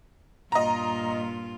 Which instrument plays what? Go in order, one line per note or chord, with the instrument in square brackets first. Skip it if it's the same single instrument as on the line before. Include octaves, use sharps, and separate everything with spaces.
[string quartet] G2 A#2 F4 [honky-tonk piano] D#5 A#5